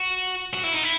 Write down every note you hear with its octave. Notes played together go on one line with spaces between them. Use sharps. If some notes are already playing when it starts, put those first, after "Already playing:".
Already playing: F#4
F#4
E4
D#4
E4